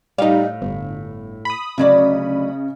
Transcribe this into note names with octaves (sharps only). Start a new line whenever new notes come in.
A2 G3 D#4 F5
G1
B5 D#6
D2 C#3 F#3 D5 D#5